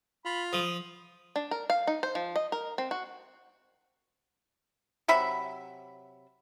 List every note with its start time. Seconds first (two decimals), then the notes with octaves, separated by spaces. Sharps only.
0.25 F4 B5
0.53 F3 D#6
1.36 D4
1.51 A#4
1.70 F5
1.87 D#4
2.03 C5
2.15 F3
2.36 D#5
2.52 A#4
2.78 C4
2.91 F#4
5.08 C3 F#3 E5 B5